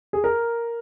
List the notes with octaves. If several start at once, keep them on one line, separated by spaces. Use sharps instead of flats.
G#4
A#4